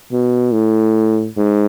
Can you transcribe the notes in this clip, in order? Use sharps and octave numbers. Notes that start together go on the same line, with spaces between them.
B2
A2
G#2